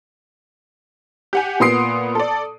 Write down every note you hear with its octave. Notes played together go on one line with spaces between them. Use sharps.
G4 F#5 G#5
A#2 B3 C6 D#6 C7 D7
A4 D5